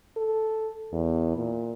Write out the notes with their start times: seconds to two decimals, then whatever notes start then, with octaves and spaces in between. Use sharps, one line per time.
0.17 A4
0.92 E2
1.36 A#2